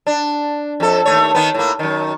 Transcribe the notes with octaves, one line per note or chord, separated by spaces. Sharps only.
D4
F2 A4
D#2 A3 C#5
D#3 B3
A2 A#3
F#2 D#3